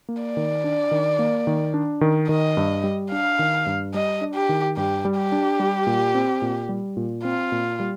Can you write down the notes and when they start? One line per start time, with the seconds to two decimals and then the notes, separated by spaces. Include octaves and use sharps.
0.09 A#3
0.23 D5
0.37 D#3
0.64 D4
0.91 D#3
1.19 A#3
1.47 D#3
1.74 D4
2.01 D#3
2.29 D#3 D#5
2.57 G2
2.84 G3
3.12 D4 F5
3.39 D#3
3.66 G2
3.94 G3 D#5
4.21 D4
4.35 G4
4.49 D#3
4.77 G2 G4
5.05 G3
5.17 G4
5.32 D4
5.60 G3
5.87 A#2
6.15 C4
6.42 A#2
6.69 G3
6.97 A#2
7.24 C4 F4
7.52 A#2
7.80 G3